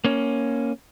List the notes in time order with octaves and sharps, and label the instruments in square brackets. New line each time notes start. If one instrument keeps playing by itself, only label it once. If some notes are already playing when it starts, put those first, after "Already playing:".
[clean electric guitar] A#3 C#4